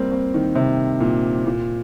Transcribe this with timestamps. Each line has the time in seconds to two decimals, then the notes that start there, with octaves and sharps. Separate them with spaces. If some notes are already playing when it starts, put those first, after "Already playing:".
Already playing: G3 A#3 C4
0.12 C4
0.34 D#3
0.55 C3
1.00 A#2
1.46 A#2